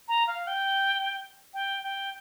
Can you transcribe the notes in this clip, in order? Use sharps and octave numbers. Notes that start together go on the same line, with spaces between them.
A#5
F5
G5
G5
G5